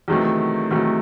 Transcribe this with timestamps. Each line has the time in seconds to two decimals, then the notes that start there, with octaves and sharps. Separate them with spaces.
0.08 E2 C3 D#3 F#3 A3
0.71 E2 C3 D#3 F#3 A3